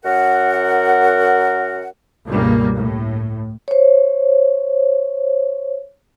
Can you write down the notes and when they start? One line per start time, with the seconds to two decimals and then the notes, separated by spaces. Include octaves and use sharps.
0.04 F#2 A#4 F#5
2.27 C#2 G2 B2 G3 A#3
2.75 A2
3.68 C5 C#5